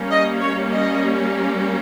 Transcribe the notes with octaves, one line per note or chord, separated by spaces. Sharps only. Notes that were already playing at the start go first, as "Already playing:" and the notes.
Already playing: G3 A#3 C#4
D#5
C#5
D#5